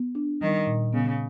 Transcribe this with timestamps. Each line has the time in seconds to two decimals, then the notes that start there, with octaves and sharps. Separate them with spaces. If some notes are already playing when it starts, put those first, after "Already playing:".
Already playing: B3
0.15 D4
0.41 D#3 G3
0.67 A#2
0.93 C#3 B3